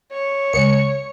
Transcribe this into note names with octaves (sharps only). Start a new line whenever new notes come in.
C#5
C#2 C#7